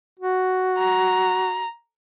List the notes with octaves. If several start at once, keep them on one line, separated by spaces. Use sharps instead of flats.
F#4
A#5